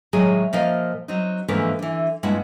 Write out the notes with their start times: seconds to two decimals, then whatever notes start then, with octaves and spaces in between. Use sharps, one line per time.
0.13 A2 D#3 F#3 G#3 G#4
0.53 A#2 F3 A#4 D#5 F5
1.08 F#3 C4 D#4
1.48 G#2 D3 E3 F3 A3 A#3
1.79 D3 E3
2.23 G2 A#2 G#3 E4 F#5 A5